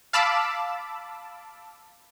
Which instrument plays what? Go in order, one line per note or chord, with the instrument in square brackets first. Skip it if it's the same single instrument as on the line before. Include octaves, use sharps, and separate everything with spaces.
[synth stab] F5 A5 B5 D6 E6